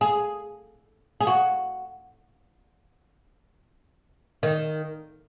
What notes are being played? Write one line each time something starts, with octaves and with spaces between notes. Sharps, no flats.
G#4
G#4
F#4
D#3